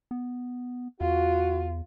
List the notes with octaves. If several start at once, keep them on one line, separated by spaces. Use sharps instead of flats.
B3
E2 F4 F#4